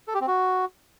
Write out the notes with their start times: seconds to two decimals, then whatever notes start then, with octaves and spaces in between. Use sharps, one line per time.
0.08 A4
0.14 G4
0.21 C4
0.27 F#4